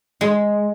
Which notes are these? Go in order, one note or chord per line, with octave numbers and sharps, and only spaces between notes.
G#3